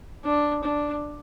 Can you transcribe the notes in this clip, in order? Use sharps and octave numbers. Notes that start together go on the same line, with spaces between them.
D4
D4